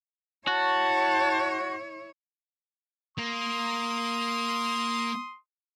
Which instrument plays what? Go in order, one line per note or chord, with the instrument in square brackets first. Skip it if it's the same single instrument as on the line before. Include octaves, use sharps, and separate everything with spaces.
[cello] E4 C#5 [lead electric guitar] F#4 [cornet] A5
[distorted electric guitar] A#3 [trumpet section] C6 D#6